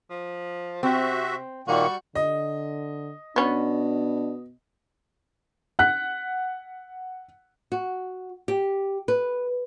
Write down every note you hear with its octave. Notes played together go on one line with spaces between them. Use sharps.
F3
C3 C4 F#4 E5
A#2 D#3 G3 A#3 F#4 C#6
D3 D#5
B2 B3 C#4 D4
F#5 F#6 B6
F#4
G4
B4